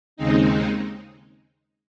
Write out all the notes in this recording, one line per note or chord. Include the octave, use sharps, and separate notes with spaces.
D#2 C#3 G#3 C4 D#4